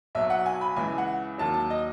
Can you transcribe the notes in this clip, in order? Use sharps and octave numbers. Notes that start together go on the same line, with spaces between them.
B1 B2 F#3 E5
F#5
G#5
B5
C#2 C#3 E3 G#5
F#5
D#2 D#3 F#3 A5
A5
D#5